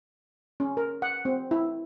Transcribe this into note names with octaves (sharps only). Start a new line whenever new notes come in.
C#4
A#4
F#5
C4
E4